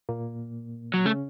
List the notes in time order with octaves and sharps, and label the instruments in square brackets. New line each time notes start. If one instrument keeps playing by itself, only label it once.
[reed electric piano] A#2 A#3
[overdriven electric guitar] F#3
[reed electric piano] C#3 C#4 [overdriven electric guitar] A3